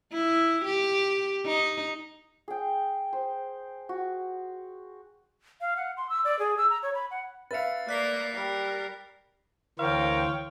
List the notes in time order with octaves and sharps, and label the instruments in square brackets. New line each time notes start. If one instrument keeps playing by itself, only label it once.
[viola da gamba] E4
G4
D#4
[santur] G#4 G5
C5
F#4
[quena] F5
F#5
C6
E6
D5
G#4
E6
A#5
C#5
B5
F#5
[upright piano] B4 E5 F5 [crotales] A6 C#7
[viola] A#3 A#4 [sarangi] D5 [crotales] F#6 B6 C7
[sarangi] G3 [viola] A#4
[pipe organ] D2 E3 C5 [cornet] A#4 [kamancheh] C#5 G5 [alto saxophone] F5